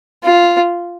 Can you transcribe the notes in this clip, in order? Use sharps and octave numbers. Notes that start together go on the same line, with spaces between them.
F4